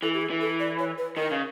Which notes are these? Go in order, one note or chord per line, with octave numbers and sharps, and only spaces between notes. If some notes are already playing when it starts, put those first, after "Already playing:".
E3 A4
G4
G#4
E3
A4
D5
C#5
B4
D#3 A#4
C#3